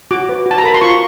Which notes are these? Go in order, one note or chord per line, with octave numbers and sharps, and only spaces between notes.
F#4 D6
B4
F#4
A5
A#5
A#4 B5
C6
F4 C#6